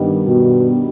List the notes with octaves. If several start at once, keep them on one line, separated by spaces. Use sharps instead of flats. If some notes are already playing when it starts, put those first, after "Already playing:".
Already playing: G2 D#3 G3 B3
B2